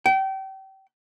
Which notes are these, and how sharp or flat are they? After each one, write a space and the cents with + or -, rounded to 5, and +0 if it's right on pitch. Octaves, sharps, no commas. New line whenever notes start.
G5 -30